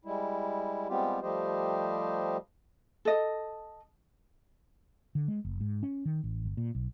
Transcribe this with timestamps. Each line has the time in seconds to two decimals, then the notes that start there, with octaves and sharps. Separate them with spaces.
0.05 G3 G#3 E4
0.89 G3 G#3 B3 C4 F4 G4
1.22 F3 G3 A3 G4 C5 D#5
3.05 A4 D#5
5.15 D3
5.28 G#3
5.45 F#1
5.61 G#2
5.83 C#4
6.05 D#3
6.24 A1
6.45 G1
6.57 A#2
6.75 B1